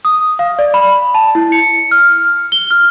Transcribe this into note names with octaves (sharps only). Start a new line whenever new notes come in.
D#6
F5
D5
B5
A5
E4
C#7
F6
G7
F6